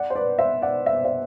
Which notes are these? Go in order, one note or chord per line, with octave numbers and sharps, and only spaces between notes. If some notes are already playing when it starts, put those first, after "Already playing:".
Already playing: D5 F#5
C5
B4 D5
C5 E5
D5 F#5
E5
D5
C5 E5